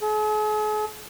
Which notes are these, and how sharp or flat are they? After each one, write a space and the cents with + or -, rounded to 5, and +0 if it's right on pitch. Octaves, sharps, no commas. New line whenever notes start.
G#4 +45